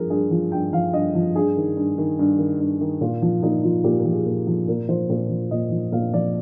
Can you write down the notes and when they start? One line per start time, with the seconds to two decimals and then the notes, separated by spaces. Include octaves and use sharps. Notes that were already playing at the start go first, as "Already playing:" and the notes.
Already playing: G2 F3 G#4 A#4
0.10 G2 G#4
0.31 F3
0.52 G2 G5
0.73 F3 F5
0.93 G2 D#5
1.15 F3
1.35 G2 G#4
1.57 D#3
1.77 G2
1.98 D#3
2.19 G2
2.39 D#3
2.60 G2
2.81 D#3
3.01 A#2 F4
3.22 F3
3.42 A#2 D#4
3.64 F3 F4
3.84 A#2 G4
3.99 A#4
4.05 F3
4.12 G#4
4.26 A#2
4.47 F3
4.68 A#2 A#4
4.89 F3 C5
5.10 A#2
5.30 F3
5.51 A#2 D#5
5.71 F3
5.92 A#2 F5
6.13 F3 D5